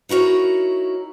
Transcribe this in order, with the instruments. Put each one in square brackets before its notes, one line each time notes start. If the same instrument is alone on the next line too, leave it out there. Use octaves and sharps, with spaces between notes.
[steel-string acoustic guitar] D#4 E4 F#4 A#4 C#5